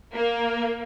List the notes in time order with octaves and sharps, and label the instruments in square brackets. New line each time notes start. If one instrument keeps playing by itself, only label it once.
[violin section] A#3